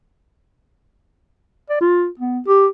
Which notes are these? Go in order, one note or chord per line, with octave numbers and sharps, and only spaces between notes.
D5
F4
B3
G4